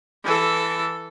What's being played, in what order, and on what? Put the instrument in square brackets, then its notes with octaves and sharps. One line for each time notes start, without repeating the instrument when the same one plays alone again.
[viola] E3 A4